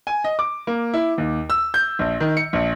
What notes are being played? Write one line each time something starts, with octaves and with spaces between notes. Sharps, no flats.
G#5
D#5
D6
A#3
E4
D#2
E6
G6
A#1
D#3
C#7
A#1